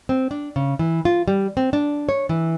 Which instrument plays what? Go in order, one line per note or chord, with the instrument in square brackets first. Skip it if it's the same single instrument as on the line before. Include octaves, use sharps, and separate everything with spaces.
[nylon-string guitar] C4
D4
C#3
E3
F4
G3
C4
D4
C#5
E3